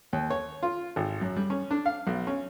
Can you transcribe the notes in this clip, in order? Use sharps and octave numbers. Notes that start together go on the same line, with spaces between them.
D#2
C#5
F4
G#1
F#2
G3
C#4
D4
F5
B1
C#4